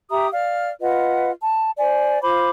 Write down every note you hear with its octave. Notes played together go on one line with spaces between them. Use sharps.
G4 E5 A#5 D#6
D5 F5 F6
F4 B4 D#5 F#5
A5
C5 D5 G#5
F4 C5 B5 D6